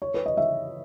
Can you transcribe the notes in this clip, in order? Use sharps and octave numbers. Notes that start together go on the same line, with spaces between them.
C#5
B4
D#5
E5